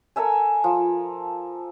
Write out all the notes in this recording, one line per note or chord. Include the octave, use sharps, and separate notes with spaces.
A4 A#4 E5 G#5
F3